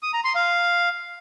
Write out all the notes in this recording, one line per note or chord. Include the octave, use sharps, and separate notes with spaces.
D#6
A#5
C6
F5